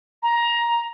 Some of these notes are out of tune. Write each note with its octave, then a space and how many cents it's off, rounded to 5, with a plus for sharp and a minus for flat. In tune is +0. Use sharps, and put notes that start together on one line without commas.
A#5 +15